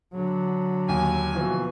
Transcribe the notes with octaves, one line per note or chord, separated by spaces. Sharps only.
D3 F#3
D#2 G#5
B2 E3 F3